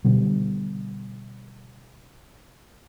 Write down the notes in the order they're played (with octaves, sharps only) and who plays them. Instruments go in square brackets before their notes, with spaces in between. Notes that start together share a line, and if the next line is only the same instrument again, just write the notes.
[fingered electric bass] B2 D3 G3